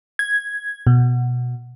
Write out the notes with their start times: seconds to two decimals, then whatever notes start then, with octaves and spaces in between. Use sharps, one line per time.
0.19 G#6
0.87 B2